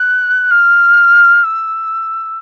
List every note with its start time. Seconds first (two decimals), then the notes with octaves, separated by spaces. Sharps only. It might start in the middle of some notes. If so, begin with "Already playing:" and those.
Already playing: F#6
0.51 F6
1.44 E6